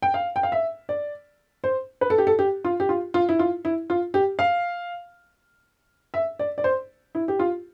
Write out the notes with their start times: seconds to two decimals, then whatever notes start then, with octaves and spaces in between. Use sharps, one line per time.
0.02 G5
0.14 F5
0.36 G5
0.43 F5
0.52 E5
0.89 D5
1.64 C5
2.01 B4
2.10 A4
2.18 G4
2.27 A4
2.39 G4
2.65 F4
2.80 G4
2.89 F4
3.14 F4
3.29 E4
3.39 F4
3.65 E4
3.90 F4
4.14 G4
4.39 F5
6.14 E5
6.39 D5
6.58 D5
6.64 C5
7.15 E4
7.28 G4
7.39 F4